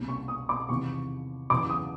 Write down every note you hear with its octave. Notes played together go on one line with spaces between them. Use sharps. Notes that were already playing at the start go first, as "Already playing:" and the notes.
Already playing: C2 B2 G3 A#3 C#4
C#6
D#6
D6
E2 C3 D#3 C#6
E2 C#3 F#3 D6
D#6